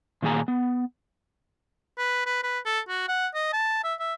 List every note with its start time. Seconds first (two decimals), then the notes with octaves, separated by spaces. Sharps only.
0.22 A#2 D#3 A#3 G#4 G#5 A#5
0.48 B3
1.98 B4
2.26 B4
2.43 B4
2.66 A4
2.88 F#4
3.08 F#5
3.34 D#5
3.53 A5
3.84 E5
3.99 E5